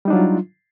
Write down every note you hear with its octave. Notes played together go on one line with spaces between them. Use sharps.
F#3 G3 D4 D#4 F4